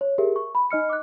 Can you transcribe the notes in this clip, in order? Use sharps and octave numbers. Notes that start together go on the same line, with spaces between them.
C#5
G4 G#4 A#4 E5
C#6
B5
D#4 D#5 F6 C#7
D6 F#6